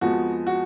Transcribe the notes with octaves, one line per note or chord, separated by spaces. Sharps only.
F2 F3 G#3 B3 F#4
F#4